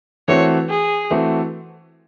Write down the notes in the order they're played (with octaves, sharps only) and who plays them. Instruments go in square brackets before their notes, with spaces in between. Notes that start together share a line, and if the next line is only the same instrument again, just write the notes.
[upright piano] E3 A3 C4 F#4 [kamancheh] C#5
[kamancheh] G#4
[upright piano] E3 A3 C4 F#4